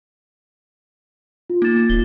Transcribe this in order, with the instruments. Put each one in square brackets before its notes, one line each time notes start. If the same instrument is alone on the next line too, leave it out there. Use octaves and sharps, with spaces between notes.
[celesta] F4
[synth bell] A#3 E7 [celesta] D#4 F4 A6
[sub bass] D1 [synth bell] G7